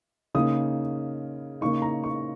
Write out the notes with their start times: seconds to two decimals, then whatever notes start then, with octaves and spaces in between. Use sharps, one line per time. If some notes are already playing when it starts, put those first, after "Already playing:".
0.35 C#3 A#3 D#4 D#6
1.61 C#3 A#3 D#4 C#6
1.82 A#5
2.04 C#6